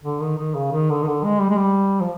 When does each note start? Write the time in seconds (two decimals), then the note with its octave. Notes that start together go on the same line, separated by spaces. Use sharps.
0.03 D3
0.21 D#3
0.38 D#3
0.55 C#3
0.73 D#3
0.90 D3
1.03 D#3
1.08 D3
1.24 G#3
1.41 G3
1.50 G#3
1.57 G3
2.00 F3